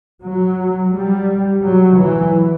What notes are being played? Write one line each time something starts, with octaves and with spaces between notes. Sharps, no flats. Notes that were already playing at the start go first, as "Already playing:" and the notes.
F#3
G3
F#3
E3